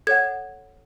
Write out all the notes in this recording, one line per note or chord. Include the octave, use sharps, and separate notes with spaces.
A4 C#5 F#5 G#6